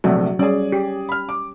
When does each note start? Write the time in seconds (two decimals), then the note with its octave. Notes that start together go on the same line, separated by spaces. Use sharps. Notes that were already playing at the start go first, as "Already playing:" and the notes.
0.04 A#1 C3 F#3 A3 F#4
0.39 G3 C#4 G#4 D5
0.72 G4
1.09 B5 F6
1.29 D6